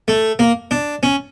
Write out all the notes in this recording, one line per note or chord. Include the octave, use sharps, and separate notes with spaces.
A3
A#3
D4
C#4